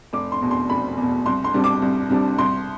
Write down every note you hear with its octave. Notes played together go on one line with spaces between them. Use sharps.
F1 D6
C6
E2 B2
C6
F1 B5
E2 B2
C2 C6
C6
C3 G3 D4
D6
C2
C3 G3 D4
C2 C6